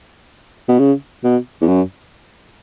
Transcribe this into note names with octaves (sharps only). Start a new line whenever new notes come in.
B2
C#3
B2
E2
F#2